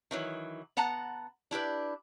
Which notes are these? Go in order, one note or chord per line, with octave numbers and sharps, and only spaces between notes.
D#3 E3 F#3
B3 F#5 A5 A#5
D4 E4 G4 B4